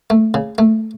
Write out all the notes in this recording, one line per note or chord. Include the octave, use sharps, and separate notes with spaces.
A3
C#3
A3